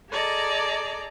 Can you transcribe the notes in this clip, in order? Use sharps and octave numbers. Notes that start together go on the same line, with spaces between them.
G#4 A4 D5 D#5 A#5